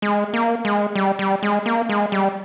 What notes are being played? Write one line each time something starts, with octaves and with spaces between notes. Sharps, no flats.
G#3
A#3
G#3
G3
G3
G#3
A#3
G#3
G3